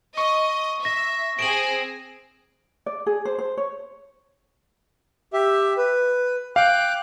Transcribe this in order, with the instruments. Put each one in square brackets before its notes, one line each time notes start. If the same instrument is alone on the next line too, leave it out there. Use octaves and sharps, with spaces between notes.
[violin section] D#5 [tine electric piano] C#6
[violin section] E5 [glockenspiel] A#6
[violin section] C4 G#4 [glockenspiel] D7 E7 F#7
[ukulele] D5
G#4
C5
C5
C#5
[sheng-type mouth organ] G4 E5
B4
[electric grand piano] F5 [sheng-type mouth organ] G5 D6 F#6